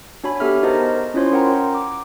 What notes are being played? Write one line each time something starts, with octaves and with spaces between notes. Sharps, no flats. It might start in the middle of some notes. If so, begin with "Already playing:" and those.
D4 F#4 C#5 G#5 B5
B3 G4 A4 E5 F6
D#4 F#4 A#4 C5 D#5 A5
C#4 E4 F4 C5 C#5 C6
C#4 A#4 F#5 G5 A#5 C6
D6